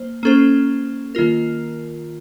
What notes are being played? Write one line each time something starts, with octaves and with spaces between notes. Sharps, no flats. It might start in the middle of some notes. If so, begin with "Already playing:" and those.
Already playing: A#3 C5
A#3 C#4 A4 C5
D#3 A#3 F4 A#4